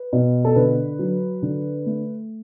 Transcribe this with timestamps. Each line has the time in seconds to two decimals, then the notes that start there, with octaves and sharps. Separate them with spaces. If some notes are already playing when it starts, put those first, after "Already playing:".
Already playing: B4
0.13 B2
0.45 A4
0.56 D3 B4
0.99 F#3
1.42 D3
1.86 A3